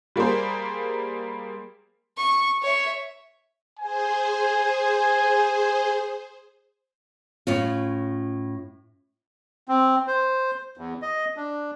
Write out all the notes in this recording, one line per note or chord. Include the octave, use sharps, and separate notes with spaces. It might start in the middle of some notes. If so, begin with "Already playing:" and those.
G3 A#3 G#4 C5
C#6
C#5 E5
G#4 C5 G#5
A2 C#4 F4
C4
C5
E2
D#5
D4